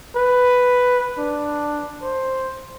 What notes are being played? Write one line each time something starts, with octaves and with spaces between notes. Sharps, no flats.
B4
D4
C5